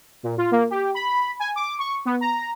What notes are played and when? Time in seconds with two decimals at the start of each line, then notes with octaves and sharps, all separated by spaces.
0.23 A#2
0.37 F4
0.51 A#3
0.70 G4
0.94 B5
1.39 G#5
1.56 D6
1.78 C#6
2.05 B3
2.21 A#5